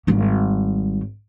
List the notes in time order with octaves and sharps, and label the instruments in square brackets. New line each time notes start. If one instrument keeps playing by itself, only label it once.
[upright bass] G#1 G3